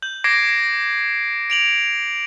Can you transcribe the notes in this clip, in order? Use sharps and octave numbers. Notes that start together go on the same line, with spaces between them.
G6 F#7
D6 G#6 A#6 C7 D7
D7 F7 F#7